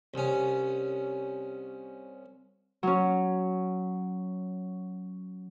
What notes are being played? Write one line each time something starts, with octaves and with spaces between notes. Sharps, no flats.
C2 C#4
F#3 C#4